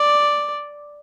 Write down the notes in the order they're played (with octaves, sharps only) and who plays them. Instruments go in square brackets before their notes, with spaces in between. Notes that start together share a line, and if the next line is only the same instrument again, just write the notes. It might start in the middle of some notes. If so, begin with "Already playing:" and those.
Already playing: [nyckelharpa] D5